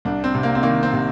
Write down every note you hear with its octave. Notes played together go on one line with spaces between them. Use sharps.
C2 D4
C4
C3
A#3
C4
D#3 A#3
C4
C3